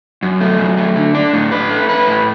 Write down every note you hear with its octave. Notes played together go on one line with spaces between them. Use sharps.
F#2
A3
F#2
A3
D3
D4
A2
B4
A3
B4
A2